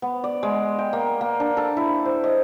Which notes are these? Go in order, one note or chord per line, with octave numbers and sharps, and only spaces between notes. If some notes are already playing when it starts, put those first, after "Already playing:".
B3
D5
G#3
G5
A#3
A#3
D4
A4
E4
C5
D#5